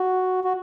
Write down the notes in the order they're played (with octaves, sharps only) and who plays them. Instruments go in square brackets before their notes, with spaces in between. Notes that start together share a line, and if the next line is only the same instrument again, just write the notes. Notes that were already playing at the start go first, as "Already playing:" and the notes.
Already playing: [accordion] F#4
F#4